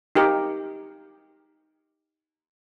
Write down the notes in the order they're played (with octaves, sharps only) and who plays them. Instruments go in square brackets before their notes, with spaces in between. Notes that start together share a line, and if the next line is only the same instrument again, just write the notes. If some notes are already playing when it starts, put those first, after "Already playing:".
[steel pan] D#4 G4 A#4